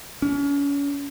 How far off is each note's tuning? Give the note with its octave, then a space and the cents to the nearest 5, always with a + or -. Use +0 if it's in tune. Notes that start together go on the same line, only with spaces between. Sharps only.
C#4 +35